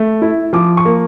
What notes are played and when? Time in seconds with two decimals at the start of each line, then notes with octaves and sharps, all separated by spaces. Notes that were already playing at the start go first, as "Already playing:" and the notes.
Already playing: A3
0.22 E4
0.53 F3 D6
0.77 C#6
0.85 A#3